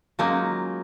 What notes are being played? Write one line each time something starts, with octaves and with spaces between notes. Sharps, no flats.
F#3 G#3 A#3 C#4 D#4 F4